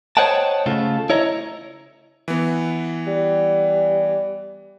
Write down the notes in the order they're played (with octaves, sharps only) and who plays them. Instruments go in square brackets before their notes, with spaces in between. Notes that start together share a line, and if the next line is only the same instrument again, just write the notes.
[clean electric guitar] C5 C#5 D#5 F#5 G5 A5
C#3 A3 F4 A4
E4 C#5 D#5 A#5
[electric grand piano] E3 B3
[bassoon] G3